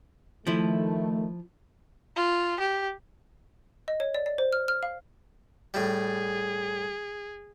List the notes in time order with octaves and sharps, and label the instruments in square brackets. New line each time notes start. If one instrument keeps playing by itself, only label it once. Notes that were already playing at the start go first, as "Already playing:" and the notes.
[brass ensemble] D#3 A3 [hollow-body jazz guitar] F3 E4
[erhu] F4
G4
[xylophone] D#5
C#5
D5
D5
C5
F6
F6
F5
[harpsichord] A2 G3 [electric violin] G#4